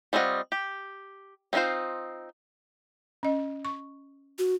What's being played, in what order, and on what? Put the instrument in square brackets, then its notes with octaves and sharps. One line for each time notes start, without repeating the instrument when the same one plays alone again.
[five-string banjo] G3 C4 F4 D#5 F#5
G4
C4 C#4 D#4 F4 C5
[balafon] C#4 D#5
C#6
[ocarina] F#4